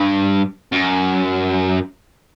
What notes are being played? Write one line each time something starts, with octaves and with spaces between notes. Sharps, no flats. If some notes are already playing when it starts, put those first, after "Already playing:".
Already playing: G2
F#2